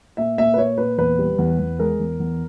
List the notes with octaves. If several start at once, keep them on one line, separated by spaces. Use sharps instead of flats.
A#2 E5
A#2 E5
B4
A#2 C#5
A#2 B4
E2 B4
G3
E2
E2
G#3 A#4
E2
E2